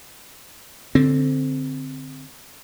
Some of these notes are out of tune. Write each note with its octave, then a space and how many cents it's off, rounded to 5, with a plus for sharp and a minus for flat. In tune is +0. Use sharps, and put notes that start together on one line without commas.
D3 +0 C4 +0